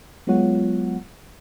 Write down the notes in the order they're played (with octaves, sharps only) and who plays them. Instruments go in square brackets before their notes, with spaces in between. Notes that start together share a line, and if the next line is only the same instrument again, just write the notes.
[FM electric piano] F#3 G#3 B3 F4 C#5 F#5